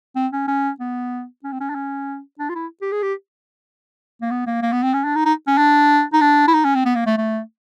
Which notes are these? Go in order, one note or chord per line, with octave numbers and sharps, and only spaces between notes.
C4
C#4
C#4
B3
C#4
C4
C#4
D4
C#4
D4
F4
E4
G4
G#4
G4
A#3
B3
A#3
A#3
B3
C4
C#4
D4
D#4
D#4
C#4
D4
D#4
D4
E4
D#4
C#4
C4
B3
A#3
A3
A3